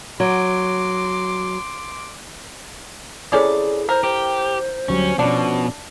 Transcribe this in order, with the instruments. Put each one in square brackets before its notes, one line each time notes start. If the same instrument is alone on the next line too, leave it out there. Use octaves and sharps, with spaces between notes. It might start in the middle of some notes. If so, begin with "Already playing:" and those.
[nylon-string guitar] F#3 [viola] C6 D6
[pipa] C3 C#4 D5 [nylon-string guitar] E4 A4 B4 [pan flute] G#4
[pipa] A#4 [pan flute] C5
[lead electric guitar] G4 [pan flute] C5
[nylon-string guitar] D2 F#3 G3 [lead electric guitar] C#4
[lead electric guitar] B2 [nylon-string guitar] F3 C#4 [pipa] D4